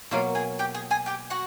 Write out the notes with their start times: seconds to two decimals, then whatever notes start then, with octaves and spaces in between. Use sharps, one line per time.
0.11 B2 F#3 A#3 F4 F5
0.35 G#4 G#5
0.59 G4 G5
0.74 G#4 G#5
0.90 G#4 G#5
1.06 G4 G5
1.30 F#4 F#5